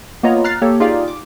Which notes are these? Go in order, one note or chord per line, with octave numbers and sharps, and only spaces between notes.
A#3 B3 F4 C#5 D#5 A#5
A#5 F6 F#6 A6 C7
A#3 G4 A4 C#5
D#4 F4 G4 G#4 D5 F5
D6